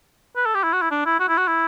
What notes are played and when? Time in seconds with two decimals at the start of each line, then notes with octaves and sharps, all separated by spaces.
0.36 B4
0.45 A4
0.55 G4
0.63 E4
0.73 F#4
0.82 E4
0.91 D4
1.06 E4
1.20 F#4
1.29 E4
1.38 F#4
1.48 E4